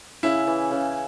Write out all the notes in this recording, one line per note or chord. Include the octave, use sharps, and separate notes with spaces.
C#3 E4
E3
C#3